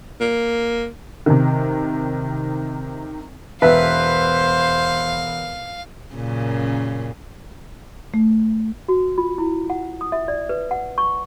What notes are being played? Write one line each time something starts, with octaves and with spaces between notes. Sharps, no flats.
A#3
C3 D#3
E1 B4 C5 E5 F5 B6
F#2 A#2 C#3
A3
F#4
F4
E4
F#5
D#6
E5
D5
B4
F#5
C#6